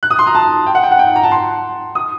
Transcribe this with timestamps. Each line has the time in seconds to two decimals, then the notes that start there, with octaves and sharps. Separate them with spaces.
0.03 F#6
0.11 D#6
0.19 C6
0.27 A#5
0.35 A5
0.67 G5
0.75 F#5
0.83 G5
0.91 F#5
0.99 G5
1.16 A#5
1.23 A5
1.31 C6
1.95 D#6